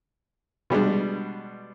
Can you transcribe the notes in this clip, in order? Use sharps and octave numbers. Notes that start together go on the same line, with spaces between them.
B2 G3 G#3 D4